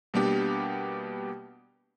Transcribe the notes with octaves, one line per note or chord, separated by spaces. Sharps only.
B2 G3 A#3 B3 D4 G4